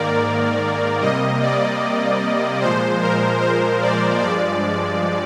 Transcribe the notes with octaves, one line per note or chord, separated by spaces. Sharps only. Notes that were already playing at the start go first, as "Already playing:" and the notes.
Already playing: G#2 D#3 A#3 A#4 D5
C3 G3 A#3 D#5
D5
A#2 F3 G#3 C5
A#4
C5
D5
G2 F3 G#3 D5